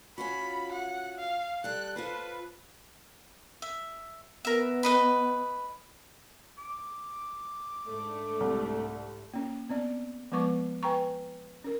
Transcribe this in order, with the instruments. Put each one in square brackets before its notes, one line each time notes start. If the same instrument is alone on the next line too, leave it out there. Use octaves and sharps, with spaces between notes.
[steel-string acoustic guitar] C#4 F4 F#4 [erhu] B5
[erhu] F#5
F5
[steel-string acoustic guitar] G3 A4 [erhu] F#6
[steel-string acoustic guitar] F4 A4 C5 [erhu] B4
[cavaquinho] E5
[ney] B3 [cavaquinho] A#4 E5
[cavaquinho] B4 D#5 B5
[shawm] D6
[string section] G#2 A3 D4
[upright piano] C2
[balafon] A#3 C#4
B3 C4 D5
F3 G#3 B3 B4 C#6 D6
B4 G5 G#5 A#5 C#6
C#4 A#4